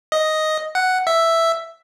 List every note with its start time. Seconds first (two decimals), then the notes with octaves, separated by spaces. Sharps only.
0.12 D#5
0.75 F#5
1.07 E5